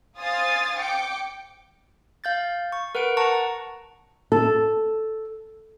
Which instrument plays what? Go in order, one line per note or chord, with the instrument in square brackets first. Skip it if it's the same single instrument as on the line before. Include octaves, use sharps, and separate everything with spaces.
[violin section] C5 F5 G#5 D#6 A6
G5 D6 C#7
[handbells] F5 G6 A6
C#6
A#4 B4 F#5 C#7 D7
F#5 A5 A#5 C#6
[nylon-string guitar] A4